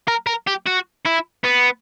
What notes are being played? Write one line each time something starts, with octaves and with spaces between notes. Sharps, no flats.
A#4
A#4
G4
F#4
E4
B3